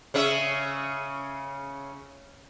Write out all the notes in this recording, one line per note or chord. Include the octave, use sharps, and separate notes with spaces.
C#3 C#4 E5